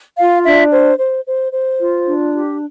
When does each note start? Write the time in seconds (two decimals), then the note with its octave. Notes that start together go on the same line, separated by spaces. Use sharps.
0.18 F4 F5
0.44 D4 E5
0.72 C5
0.99 C5
1.26 C5
1.52 C5
1.79 F4
2.06 D4
2.33 G4